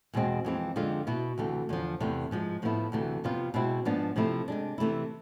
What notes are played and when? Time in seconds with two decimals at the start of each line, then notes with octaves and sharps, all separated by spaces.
0.14 E2 B2 G#3 C4
0.45 F2 E3 G#3 C4
0.76 F2 D3 G#3 C4 F4
1.07 B2 B3 E4
1.38 D2 C3 E3 A3
1.69 E2 D3 F3
2.00 E2 C3 E3 A3
2.31 G#2 F3 G#3
2.62 A2 F3 B3 E4
2.92 D2 C3 E3 A3
3.24 F2 C3 F3 B3 F4
3.54 B2 G#3 C4 E4
3.85 G#2 F3 B3 D4
4.16 C3 F3 A3 E4
4.48 C3 G#3 D4
4.78 C3 E3 A3 E4